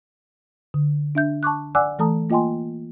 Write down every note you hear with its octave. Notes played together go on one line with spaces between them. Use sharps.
D3
D4 E5 G6
A5 C#6 D6 F#6
D5 F#5 G#5 D6 E6 F#6
E3 A3 A4 A5 A#5 D#6
A#3 F4 D#5 G5 G#5 C6